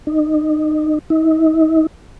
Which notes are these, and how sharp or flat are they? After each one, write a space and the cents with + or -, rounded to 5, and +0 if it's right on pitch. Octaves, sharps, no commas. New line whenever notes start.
D#4 -25
D#4 +40